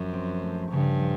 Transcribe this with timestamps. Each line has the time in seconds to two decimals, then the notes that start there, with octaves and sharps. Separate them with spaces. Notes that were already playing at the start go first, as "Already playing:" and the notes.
Already playing: F#2 F3
0.13 C4
0.42 A3
0.72 G2 C#3
1.01 F3